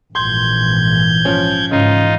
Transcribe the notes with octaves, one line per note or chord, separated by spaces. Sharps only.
A#1 G#2 E3 C6 G6 G#6
F3 C#4
G#2 C#3 E3 D#4 F4